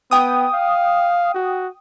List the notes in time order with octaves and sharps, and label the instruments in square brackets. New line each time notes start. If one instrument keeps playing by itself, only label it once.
[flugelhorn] B3 [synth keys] G5 D#6
[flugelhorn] F5
F#4